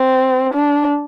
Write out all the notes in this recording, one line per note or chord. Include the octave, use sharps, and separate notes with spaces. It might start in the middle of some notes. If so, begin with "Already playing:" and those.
Already playing: C4
D4